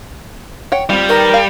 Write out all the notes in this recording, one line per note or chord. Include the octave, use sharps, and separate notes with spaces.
C#5 F#5 G5
G3 C4 F4
D#3 D#4 A#4 B4
F5